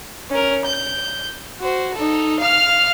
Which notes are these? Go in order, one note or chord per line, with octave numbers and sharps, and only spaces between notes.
C#4 A#4
G6
F#4 C5
D#4 A4
F5 F6